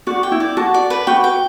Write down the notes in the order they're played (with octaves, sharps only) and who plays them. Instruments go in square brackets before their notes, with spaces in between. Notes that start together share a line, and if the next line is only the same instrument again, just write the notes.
[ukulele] F#4 [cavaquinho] D5
[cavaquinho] G5
[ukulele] E4
[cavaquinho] D5
[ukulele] F#4 [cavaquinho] A5
[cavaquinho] D5
B4
[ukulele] F#4 [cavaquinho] G5
[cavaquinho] G5